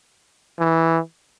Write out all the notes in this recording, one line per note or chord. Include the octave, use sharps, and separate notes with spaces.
E3